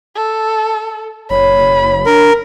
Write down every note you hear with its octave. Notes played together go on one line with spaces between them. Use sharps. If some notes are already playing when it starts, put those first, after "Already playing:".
A4
F#1 C#5 B5
D4 A#4